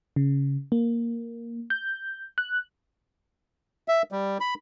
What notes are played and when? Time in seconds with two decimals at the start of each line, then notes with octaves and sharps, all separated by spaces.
0.16 C#3
0.72 A#3
1.70 G6
2.38 F#6
3.88 E5
4.12 G3
4.41 B5